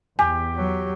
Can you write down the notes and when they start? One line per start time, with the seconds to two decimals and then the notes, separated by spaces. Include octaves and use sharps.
0.19 E2 G4 G#5
0.56 F#3